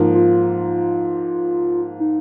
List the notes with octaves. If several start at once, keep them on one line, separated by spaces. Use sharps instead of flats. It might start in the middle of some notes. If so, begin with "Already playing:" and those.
Already playing: G#2 F3 A#3
F4
D#4